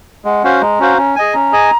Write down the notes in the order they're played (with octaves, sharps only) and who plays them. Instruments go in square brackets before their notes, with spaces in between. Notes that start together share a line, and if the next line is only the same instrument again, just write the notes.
[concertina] G#3 [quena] F#5
[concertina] C#4 F#4 C5 F5
[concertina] G#3 [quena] A#5
[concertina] C#4 F#4 C5 F5
C#4
G#4 D#5 G#5
[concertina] C#4 [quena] A#5
[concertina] G#4 D#5 G#5